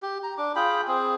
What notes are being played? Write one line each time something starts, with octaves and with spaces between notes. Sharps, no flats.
G4
A#5
D4 D6
F4 G#4 G5 B5
C4 G#4